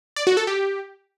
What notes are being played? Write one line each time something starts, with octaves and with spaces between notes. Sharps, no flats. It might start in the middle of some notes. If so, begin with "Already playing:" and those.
D5
F#4
A4
G4